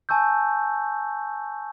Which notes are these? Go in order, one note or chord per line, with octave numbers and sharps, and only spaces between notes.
G#5 A5 C#6 E6 G6